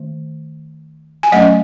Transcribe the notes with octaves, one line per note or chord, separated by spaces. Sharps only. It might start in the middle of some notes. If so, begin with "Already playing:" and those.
Already playing: D#3 A3
G#5
F#3 A3 C#4 D#5 F#5